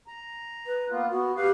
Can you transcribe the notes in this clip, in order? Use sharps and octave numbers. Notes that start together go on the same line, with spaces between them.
A#5
B4
A#3 B3 F4
B3 F#4
D2 G4 B4 F5